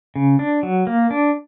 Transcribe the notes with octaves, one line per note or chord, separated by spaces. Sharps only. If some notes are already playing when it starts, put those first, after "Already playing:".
C#3
D4
F#3
A#3
D4